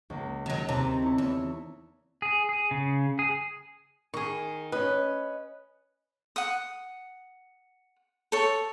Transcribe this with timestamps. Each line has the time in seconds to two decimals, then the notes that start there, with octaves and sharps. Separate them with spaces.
0.10 C#2 A#3
0.46 D#3 F#3
0.69 D#2 C3 A5 A#5
1.02 E4 C#5
1.18 E2
2.22 G#4
2.49 G#4
2.71 C#3
3.19 G#4
4.14 D#3 G#4 C#6
4.72 C#4 B4 D#5
6.36 F#5 D#6
8.32 A4 C#5